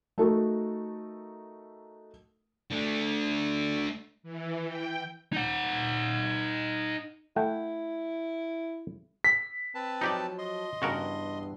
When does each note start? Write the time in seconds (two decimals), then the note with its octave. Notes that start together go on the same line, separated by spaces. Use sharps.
0.18 A3 D#4 F#4 A4 A#4
2.71 A3 D4
4.23 E3
4.68 G5
5.32 D#4 F#5
7.36 A3 E4 F#5 G5
9.24 B6
9.75 C4 B4 A5
10.01 F3 F#3 D#4 G4 D5
10.38 D#5 C6
10.82 E2 G2 C#3 E3 F#4 A#4